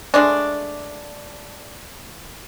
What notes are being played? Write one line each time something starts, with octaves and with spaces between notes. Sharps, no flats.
G#3 A3 D4